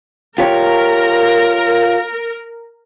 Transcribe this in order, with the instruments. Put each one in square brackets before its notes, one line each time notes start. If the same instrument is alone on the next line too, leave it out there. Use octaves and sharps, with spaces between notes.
[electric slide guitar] F4 G4 C#5 [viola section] A#4